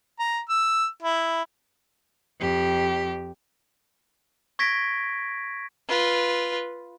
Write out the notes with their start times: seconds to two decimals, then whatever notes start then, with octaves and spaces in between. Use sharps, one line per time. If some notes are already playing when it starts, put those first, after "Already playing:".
0.19 A#5
0.49 E6
1.03 E4
2.40 F2 G4
4.59 C#6 G#6 A#6 B6 D7
5.89 F4 B4